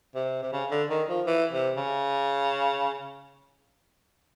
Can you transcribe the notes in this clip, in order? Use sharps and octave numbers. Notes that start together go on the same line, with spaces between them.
C3
C3
C#3
D3
D#3
F3
E3
C3
C#3